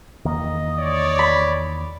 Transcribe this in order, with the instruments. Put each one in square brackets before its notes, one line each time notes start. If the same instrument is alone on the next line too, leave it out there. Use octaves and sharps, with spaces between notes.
[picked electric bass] E2 D#3 A#3 [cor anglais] D#5
[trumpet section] C#5 D5
[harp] B5